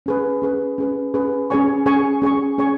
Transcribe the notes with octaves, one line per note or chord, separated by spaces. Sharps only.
C#4 G#4 B4
C#4 G#4 B4
C#4 G#4 B4
C#4 G#4 B4
C#4 G#4 C#5 G#5 C#6
C#4 G#4 C#5 G#5 C#6
C#4 G#4 C#5 G#5 C#6
C#4 G#4 C#5 G#5 C#6